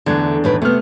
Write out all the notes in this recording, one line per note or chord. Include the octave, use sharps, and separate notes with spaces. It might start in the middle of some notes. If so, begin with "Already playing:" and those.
E2 D3 A3 D4 G#6
A2 D#3 B4
C3 A3 B3 F6